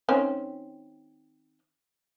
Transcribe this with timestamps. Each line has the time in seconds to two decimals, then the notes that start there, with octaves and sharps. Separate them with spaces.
0.09 D#3 C4 C#4